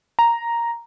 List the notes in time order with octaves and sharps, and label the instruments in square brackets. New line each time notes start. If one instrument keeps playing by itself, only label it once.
[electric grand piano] A#5